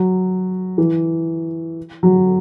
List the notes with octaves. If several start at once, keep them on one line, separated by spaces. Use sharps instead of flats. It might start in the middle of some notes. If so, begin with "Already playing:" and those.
Already playing: F#3
E3
F#3